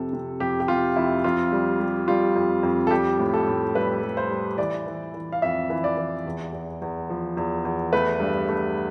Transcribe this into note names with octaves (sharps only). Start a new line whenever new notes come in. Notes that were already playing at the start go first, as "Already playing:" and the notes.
Already playing: F2 C3 A4
C3
F2 G4
G4
C3 F4
F2 E4
F2 F4
G3
G3
G3 F4
F2
F2
A4
G3 G4
A2
A4
A2
G3 B4
G3
C5
G3
E3 D5
E3
E3
F5
F2 E5
E3
D5
E3
E2
E2
E2
F3
E2
E2
A3 B4
G2
A3